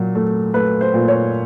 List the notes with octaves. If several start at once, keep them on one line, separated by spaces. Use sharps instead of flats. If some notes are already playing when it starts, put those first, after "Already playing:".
Already playing: A#2 F#3
A3
A3 B4
C5
A#2
C#5